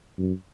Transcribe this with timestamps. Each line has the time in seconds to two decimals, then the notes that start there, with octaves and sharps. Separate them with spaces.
0.18 F#2